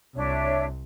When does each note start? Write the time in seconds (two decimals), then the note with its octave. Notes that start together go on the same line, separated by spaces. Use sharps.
0.16 C2 D4 C#5 E5